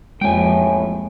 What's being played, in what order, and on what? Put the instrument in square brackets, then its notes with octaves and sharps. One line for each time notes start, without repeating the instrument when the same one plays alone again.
[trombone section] A1 A2 [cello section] F2 [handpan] G#3 A#3 [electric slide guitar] G5 G#5